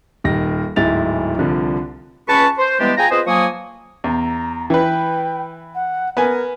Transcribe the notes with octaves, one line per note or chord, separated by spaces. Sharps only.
D#1 D#3 A#6
D1 G#2 E4 A6 F7
C2 D3 F3
C#2 C#4 B4 A5 B5 C#6
C5
E3 G3 G#3 B3 D4 G4
F4 G#4 G5 G#5 A#5
C4 F4 G#4 B4 C5 D#5
F3 F#3 A#3 G#5 C#6 D#6
E2 A#5
E3 B4 G5
F#5
B3 A#4 G#5